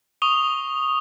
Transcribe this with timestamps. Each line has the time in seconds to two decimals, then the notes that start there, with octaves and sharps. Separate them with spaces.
0.22 C#6 D#6 F7 G7